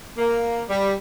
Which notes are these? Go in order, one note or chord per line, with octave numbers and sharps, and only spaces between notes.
A#3
G3